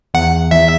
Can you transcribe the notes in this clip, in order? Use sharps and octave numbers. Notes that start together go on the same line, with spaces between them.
E2 F#5
E2 E5